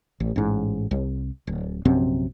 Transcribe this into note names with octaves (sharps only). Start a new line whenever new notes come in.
A1
A1 G#2
C2
D1
A#1 F#2 C3 C4